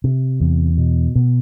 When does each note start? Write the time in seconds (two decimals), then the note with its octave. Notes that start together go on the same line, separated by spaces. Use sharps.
0.04 C3
0.40 E2
0.78 B2
1.16 B2